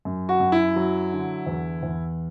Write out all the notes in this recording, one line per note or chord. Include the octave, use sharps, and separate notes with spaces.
F#2
F#4
F#2
E4
F#3
D3
E2
E2